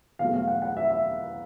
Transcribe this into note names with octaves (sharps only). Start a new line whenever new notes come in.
E2 B2 F#3 A3 F5
F5
F#5
F#5
E5
E5